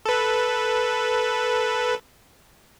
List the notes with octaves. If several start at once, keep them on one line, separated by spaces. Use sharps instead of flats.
A4 B4